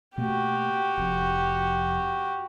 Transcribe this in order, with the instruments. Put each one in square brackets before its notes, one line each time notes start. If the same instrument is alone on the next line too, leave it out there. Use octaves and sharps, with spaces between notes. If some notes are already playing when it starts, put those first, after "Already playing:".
[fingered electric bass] B2 A3 A#3 [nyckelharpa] F#4 G4
[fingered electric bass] F1 F2